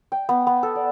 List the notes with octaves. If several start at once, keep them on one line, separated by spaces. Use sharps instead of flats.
G5
B3
B3
A4
D5